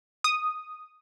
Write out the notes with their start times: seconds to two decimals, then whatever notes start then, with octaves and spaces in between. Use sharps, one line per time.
0.24 D#6